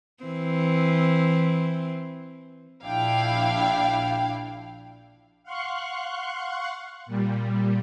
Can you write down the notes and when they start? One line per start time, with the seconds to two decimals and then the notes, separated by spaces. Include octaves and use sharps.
0.23 E3 C4
2.84 A#1 D4 E4 F5 G5
5.43 F5 F#5 C6 C#6 F#6
7.06 A#2 G3